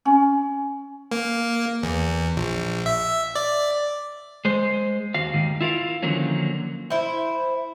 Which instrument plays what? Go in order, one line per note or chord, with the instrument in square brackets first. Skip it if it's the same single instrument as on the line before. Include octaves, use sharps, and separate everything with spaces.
[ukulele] C#4
[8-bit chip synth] A#3
E2
A#1
E5
D5
[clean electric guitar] G#3 C5
D#2 F#4 F5
D#2 G#2 D#3
E4 F4 A#4 F5
D3 D#3 F3 F#3 A#3 C#4
[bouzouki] E4 C5